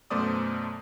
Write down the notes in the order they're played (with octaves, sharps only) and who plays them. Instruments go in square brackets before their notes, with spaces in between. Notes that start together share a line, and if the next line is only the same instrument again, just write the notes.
[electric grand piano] F#2 B2 A3 C5 D5 D#6